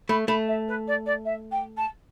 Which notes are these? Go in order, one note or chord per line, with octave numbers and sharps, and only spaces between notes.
A3 B5
A3 B5
E5
B4
D5
D5
E5
G5
A5